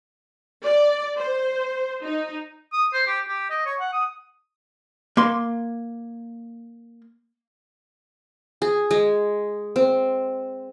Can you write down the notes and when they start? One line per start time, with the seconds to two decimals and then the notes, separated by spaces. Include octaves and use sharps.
0.64 D5
1.17 C5
2.04 D#4
2.73 D#6
2.93 C5
3.07 G4
3.28 G4
3.50 D#5
3.66 C#5
3.80 F#5
3.93 D#6
5.17 A#3 C6
8.62 G#4
8.91 G#3
9.76 C4